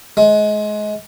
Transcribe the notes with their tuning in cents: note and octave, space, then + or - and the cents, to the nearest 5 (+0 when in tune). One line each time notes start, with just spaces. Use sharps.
G#3 +25